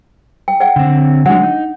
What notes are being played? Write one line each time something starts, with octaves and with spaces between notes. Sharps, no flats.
G5
D5 F#5 G5
D3 C4
F#3 G#3 D4 F#5
D#4